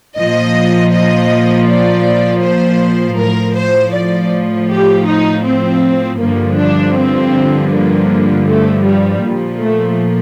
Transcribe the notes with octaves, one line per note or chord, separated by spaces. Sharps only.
A#2 F3 D#5
D#5
D5
C5
A2 F3 A#4
C5
D5
G4
D#4
C4
G2 D3 F3 A#3
D4
C4
A#3
A3
G3
A#2 F3
A3